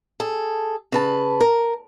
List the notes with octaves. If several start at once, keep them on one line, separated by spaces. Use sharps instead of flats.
G#4 A4
C#3 B4 A5
A#4